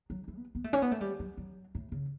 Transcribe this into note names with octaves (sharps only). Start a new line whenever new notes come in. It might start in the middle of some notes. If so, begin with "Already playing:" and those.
F#3
E3
B3
B3
A3
C#4
B3
A3
G3
F#3
F#3
A2
C#3